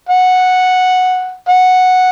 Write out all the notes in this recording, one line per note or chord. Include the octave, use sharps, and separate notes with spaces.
F#5
F#5